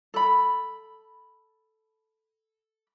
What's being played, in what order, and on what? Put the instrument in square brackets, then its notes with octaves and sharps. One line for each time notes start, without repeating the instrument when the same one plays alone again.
[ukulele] A4 B5